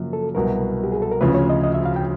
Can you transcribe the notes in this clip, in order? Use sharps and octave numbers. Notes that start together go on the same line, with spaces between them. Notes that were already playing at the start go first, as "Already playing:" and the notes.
Already playing: F#2 C#3 F3 A#3
A4
C2 B2 F#3 A#4
G4
G#4
A4
A#4
D2 C#3 F3 B4
C#5
D#5
D#5
E5
F5
G5